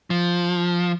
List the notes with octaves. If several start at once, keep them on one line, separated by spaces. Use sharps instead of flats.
F3